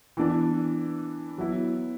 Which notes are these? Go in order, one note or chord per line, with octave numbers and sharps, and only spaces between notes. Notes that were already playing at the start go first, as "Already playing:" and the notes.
E3 B3 D4
F#3 B3 E4